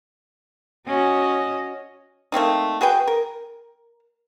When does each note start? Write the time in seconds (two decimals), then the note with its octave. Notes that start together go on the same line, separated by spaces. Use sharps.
0.87 C#4 F#4 D#5
2.32 A3 A#3 C4 D#4
2.81 F#4 G#4 B4 G5
3.07 A#4